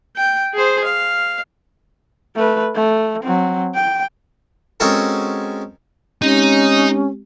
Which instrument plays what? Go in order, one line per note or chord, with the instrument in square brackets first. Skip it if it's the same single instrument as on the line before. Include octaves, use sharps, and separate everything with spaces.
[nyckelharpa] G5
G#4 C5
F5
[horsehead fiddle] A3 B4
A3
F#3 C4
G5
[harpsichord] G#3 C4 C#4 F#4 A4 A#4
[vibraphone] G#3 C4 G4 [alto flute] C#4 [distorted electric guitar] D#4